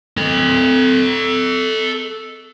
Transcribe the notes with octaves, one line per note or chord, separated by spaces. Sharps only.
A4 D#5